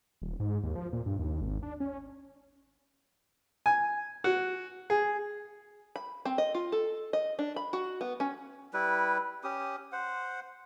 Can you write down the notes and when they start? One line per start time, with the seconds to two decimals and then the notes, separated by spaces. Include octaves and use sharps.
0.22 D#1
0.40 G#2
0.63 D#2
0.75 F3
0.93 A#2
1.06 G2
1.19 D#2
1.41 G#1
1.63 D4
1.80 C#4
3.66 G#5
4.24 F#4
4.90 G#4
5.96 B5
6.25 C4
6.38 D#5
6.54 F4
6.72 A4
7.13 D#5
7.39 D4
7.56 B5
7.73 F#4
8.01 B3
8.20 C#4
8.74 G3 E4 B4
9.44 C#4 G4 D#6
9.92 C5 F#5